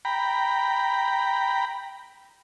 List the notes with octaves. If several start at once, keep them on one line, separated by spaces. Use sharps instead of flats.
G5 A#5 B5